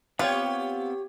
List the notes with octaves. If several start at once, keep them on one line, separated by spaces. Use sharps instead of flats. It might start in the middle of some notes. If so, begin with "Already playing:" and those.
B3 C4 F4 G4 B4 C#5 F#5